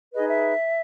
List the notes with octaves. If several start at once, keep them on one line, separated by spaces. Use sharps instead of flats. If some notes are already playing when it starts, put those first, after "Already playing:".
D#4 G#4 B4 D#5
E5